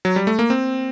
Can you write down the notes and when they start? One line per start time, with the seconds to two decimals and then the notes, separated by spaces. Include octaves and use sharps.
0.05 F#3
0.16 G3
0.27 A3
0.39 A#3
0.50 C4